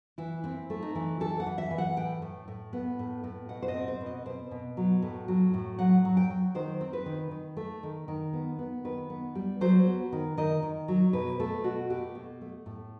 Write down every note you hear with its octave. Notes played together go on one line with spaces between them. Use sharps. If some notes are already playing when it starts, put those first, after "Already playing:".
E3 E4
C4 E4
A3
D#4
E3
E3 A4
F#5
E3
E5
E3
F#5
A2 G5
A2
A2
B3
A2
A2
B2 F#5
C5
D#5
C4
C5
B2
D#5
B2 C5
B2
F#3
A2
F#3
A2
F#3 F#5
F#3
G5
F#3
D#3 C5
C4
B4
D#3
D#3
A3
D#3
D#3
B3
B3
D#3 B4
B3
G3
F#3 C5
B3
D#3
D#3 D#5
D#3
F#3
B2 B4
A3 A4
B2 F#4
A3 G4
B2
A3
A2